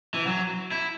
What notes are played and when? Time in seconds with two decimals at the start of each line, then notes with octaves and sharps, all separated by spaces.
0.14 E3
0.27 F#3
0.71 E4